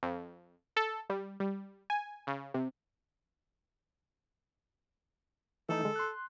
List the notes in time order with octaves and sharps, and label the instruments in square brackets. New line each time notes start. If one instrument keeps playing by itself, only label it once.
[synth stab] F2
A4
G3
G3
G#5
C#3
C3
[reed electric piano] E3 A3 D#4 [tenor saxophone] A4
[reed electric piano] D3 G#3
C6 F#6